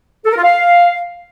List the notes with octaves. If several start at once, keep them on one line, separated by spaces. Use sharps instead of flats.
A4
A#4
F4
F5